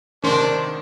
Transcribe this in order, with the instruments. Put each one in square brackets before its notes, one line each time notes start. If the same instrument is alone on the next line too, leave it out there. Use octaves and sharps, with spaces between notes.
[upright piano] G#2 D#3 [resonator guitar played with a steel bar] C3 C4 C5 [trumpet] D4 [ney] A#4